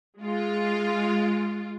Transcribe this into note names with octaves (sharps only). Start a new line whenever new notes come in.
G#3 F4